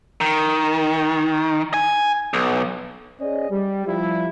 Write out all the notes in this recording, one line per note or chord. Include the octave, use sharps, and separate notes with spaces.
D#3
G#5
B1
C#4 G#4 C5 D5 D#5
G3
F3 G3 E4